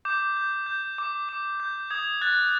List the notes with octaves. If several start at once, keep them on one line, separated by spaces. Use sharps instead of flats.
D6 G6
G6
G6
D6
D6
G6
D#6 G#6
F#6 A6